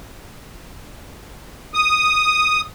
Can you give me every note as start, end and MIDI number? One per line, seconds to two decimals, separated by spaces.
1.74 2.61 87